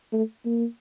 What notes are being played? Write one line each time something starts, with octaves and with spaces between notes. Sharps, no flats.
A3
A#3